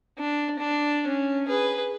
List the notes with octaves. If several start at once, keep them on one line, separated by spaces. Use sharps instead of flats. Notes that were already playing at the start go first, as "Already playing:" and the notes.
D4
D4
C#4
G#4 B4